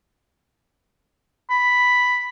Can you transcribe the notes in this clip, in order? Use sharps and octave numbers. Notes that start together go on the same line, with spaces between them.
B5